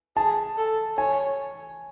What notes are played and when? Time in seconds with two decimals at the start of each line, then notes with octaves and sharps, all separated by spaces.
0.16 G#4 A5
0.57 A4
0.98 C#5 G#5